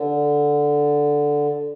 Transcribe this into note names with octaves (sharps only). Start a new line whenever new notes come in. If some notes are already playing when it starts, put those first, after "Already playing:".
Already playing: D3